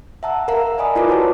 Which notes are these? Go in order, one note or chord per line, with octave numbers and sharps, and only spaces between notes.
E5 F#5 A5 A#5 E6
A#4 E5 F5 A#5
D5 D#5 G#5 B5 D#6
E4 F4 A#4 B4 D6
E4 F#4 C5 C#5 A5